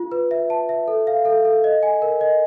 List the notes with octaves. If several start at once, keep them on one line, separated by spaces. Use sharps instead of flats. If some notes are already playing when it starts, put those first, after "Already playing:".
Already playing: F4
B4
E5
A5
E5
A4
F5
A4
A4
D#5
G#5
A#4
D#5